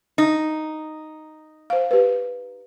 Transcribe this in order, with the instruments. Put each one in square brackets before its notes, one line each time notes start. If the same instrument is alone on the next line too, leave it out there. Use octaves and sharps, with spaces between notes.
[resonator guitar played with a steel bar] D#4
[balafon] C5 F5
G4 B4